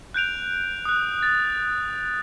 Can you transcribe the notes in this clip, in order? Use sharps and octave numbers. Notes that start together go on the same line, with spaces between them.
F#6 G6 D7 F7
D#6 F#6
A6